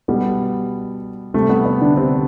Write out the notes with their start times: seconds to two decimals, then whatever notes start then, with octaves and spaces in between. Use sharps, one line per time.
0.08 B2 G3 B3
1.34 C3 G3 A3
1.49 B3
1.66 B3
1.81 D3 D4
1.97 C3 C4